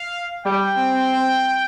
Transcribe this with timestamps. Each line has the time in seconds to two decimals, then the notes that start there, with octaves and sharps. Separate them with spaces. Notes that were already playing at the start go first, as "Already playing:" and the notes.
Already playing: F5
0.45 G3 G5
0.75 C4